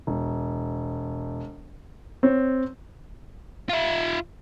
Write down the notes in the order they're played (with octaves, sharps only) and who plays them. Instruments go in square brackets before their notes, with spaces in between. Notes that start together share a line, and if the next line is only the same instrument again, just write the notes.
[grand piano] E1
C4 C#5
[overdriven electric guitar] F4 E5